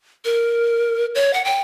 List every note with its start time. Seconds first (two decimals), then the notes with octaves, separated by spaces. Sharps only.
0.25 A#4
1.15 C#5
1.33 F#5
1.45 G5